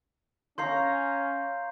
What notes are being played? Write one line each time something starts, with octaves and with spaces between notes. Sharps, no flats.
C#4 C#5 F5 A#5 C6 G6 C7